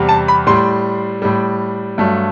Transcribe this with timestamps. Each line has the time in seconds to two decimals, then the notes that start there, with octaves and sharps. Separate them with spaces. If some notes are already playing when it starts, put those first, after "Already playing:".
Already playing: E2 C3 G3
0.09 A5
0.28 B5
0.47 A2 G3 C6
1.22 A2 G3
1.98 G2 F#3 A3